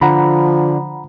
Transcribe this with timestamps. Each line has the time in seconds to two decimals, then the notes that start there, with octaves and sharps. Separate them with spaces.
0.01 D3 F3 F#5 A#5 B5